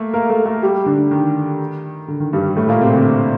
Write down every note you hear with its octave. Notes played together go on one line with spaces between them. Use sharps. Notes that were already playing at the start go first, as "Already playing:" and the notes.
Already playing: A3 A#3 A4
A#3 A#4
A3 A4
A3 A4
G3 G4
D3 D4
D#3
D3
D#3
G2 G3
G3
A2 A3
A#2 A#3
C3 C4
D3 D4